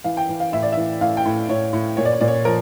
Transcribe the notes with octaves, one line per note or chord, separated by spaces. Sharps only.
E3 F5
G5
E3
F5
A2 E5
D5
E3 E5
A2 F5
G5
A2
A2 C#5
A2
A#2 C#5
D5
C#5
A#2 D5
C#5
F3 A#4